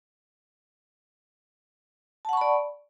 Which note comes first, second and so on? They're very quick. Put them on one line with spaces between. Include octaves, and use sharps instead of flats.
A5 F#5 C#6 B5 D5